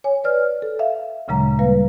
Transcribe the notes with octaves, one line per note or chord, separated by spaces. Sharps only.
C#5 G#5
B4 D5 F6
A4
E5 F5
D2 A#2 C#3 F#3 G#3 A#5
G3 A#3 B4 F5